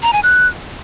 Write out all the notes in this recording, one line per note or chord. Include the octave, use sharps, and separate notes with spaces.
A#5
G#5
F#6